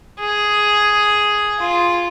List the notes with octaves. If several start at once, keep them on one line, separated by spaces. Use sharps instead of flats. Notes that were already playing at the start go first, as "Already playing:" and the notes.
G#4
F4